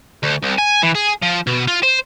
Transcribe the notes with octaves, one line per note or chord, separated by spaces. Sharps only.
D2
C2
G#5
E3
G#4
F3
B2
F4
C5